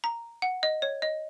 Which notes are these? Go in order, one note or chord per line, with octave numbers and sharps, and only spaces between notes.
A#5
F#5
D#5
C#5
D#5